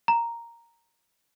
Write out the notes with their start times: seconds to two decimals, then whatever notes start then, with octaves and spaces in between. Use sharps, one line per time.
0.08 A#5